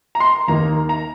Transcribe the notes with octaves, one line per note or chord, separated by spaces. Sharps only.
A#5
C6
D#2 D#3 A#3 D#4 A#5
A#5